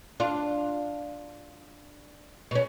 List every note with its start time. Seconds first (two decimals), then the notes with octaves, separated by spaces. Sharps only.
0.20 D4 F4
2.51 B2 C#4